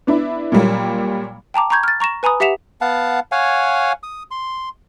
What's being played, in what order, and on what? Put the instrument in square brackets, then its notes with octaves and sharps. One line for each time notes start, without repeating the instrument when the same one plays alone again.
[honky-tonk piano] B3 D4 E4
A#2 F#3 G3 A#3
[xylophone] G5 A5 A#5 D6
A#5 B5 C#6 G6 G#6
F6 A6
A#5 C#6 A#6 E7
B4 G#5 A#5 B5 D#6
G4 E5 F#5 B6 E7 F7
[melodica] B3 F5 F#5 A5
C#5 F5 F#5 G#5
D#6
C6